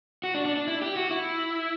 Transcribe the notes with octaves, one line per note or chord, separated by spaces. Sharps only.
F#4
D4
D4
D4
E4
G4
F#4
E4